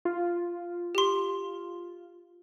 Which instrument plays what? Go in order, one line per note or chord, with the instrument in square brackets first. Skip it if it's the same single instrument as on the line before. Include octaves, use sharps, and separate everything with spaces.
[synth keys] F4
[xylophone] G4 C6